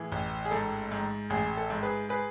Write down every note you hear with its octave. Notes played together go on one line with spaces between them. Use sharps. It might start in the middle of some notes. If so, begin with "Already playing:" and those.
Already playing: A2 E3 G#4
A1
G#4
G#2 A4
G#2
A1 G#4
A4
G#2
G#4 B4
G#4 B4